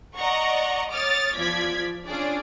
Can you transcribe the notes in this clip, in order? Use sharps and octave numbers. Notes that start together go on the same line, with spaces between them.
D5 D#5 F#5 A#5 C#6
C#5 D6 D#6 F6 A6
E2 F3 D5 G#6 B6
C#4 D4 F4 G#4 D5